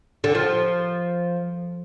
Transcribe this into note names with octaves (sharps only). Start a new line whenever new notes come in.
D3
F3